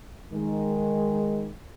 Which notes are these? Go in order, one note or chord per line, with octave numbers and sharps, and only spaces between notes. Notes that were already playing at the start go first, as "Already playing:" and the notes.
D#3 G#3